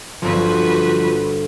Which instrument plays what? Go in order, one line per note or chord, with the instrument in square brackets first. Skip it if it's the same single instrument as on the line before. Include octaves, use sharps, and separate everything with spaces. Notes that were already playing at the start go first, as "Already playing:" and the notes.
[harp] G1 C4 [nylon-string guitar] F3 [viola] F#4 B4